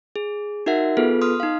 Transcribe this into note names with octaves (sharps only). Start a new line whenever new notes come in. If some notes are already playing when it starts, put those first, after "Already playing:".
G#4
D#4 F#4 A#4 E5 F#5
B3 F4 G#4 A4 B4
C6 D#6 F6
D#4 F5